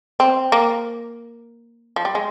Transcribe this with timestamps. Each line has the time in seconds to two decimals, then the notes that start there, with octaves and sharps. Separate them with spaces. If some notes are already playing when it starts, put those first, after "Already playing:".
0.20 C4
0.52 A#3
1.96 F3
2.05 G3
2.15 G#3